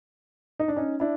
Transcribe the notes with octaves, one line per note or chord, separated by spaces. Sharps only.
D#4
D4
C#4 D#4
D4 E4